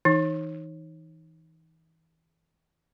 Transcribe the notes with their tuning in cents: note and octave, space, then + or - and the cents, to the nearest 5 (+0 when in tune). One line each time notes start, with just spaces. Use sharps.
E3 -30 D#4 +0